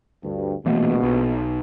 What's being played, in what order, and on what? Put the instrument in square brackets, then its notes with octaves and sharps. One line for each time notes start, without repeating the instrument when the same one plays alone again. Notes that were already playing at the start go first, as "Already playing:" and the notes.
[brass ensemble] D2 G2
[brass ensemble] A#1 B2 [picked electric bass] E3 A3 A#3
[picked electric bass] B1